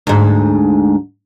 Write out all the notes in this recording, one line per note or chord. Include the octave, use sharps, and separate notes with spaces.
D2 G#2